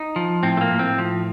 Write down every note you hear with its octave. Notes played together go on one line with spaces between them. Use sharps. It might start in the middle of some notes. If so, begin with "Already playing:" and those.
Already playing: D#4
F3
A2 C4
A3
A#3
A2
C4
F3